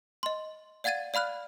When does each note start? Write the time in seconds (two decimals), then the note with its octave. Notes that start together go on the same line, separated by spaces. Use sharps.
0.23 D#5 C6
0.84 D5 F5 F#5 G#6 A6 D#7
1.14 D5 F5 B5 F6 F#6